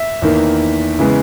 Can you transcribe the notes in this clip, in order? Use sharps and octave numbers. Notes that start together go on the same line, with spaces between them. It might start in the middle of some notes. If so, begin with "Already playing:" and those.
Already playing: E5
E2 D#3 A#3
C#3 E3 G#3 B3